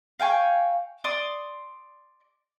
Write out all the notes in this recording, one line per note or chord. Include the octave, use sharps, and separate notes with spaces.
F5 G5 G#5 C#6
D5 C6 D#6